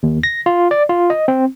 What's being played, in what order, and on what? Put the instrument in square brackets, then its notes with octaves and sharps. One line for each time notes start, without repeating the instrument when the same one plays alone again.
[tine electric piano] D#2
A#6
F4
D5
F4
D#5
C4